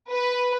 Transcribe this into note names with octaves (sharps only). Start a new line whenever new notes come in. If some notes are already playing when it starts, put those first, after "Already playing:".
B4